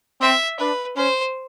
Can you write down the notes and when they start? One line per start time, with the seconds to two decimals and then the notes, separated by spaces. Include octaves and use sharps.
0.21 C4 E5
0.58 D4 B4
0.96 C#4 C5